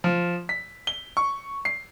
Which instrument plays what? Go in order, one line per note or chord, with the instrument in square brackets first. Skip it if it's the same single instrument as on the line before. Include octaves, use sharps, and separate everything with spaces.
[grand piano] F3
B6
G7
C#6
C7